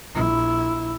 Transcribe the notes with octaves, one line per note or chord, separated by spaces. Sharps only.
A#1 E4